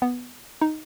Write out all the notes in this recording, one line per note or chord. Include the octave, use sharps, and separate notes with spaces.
B3
D#4